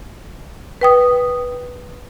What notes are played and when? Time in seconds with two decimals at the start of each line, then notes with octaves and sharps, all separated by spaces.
0.81 B4 G5 D#6